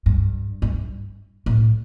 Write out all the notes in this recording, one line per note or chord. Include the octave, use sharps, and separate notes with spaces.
G2
G2
A2